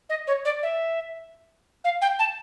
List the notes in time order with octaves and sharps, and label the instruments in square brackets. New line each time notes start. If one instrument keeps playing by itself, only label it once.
[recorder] D#5
C#5
D5
E5
F5
G5
A5